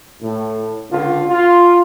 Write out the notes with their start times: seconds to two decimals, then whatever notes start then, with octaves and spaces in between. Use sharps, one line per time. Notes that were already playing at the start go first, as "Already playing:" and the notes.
0.21 A2
0.90 C#2 D3 F4
1.29 F4